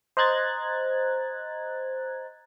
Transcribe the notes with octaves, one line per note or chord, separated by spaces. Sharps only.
C5 D#5 A#5 F#6 G#6 A6